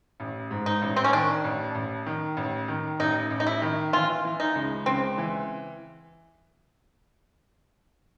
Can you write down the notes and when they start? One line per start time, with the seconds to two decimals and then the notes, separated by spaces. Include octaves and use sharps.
0.20 A1
0.51 G#2
0.66 D#4
0.82 A1
0.96 C4
1.04 C#4
1.12 D#3 D4
1.44 A1
1.75 A1
2.06 D#3
2.37 A1
2.68 D#3
3.00 A1 D#4
3.31 A1
3.40 D#4
3.47 E4
3.62 D#3
3.93 E3 F4
4.24 E3
4.40 D#4
4.55 C#2
4.86 C#2 C4
5.18 E3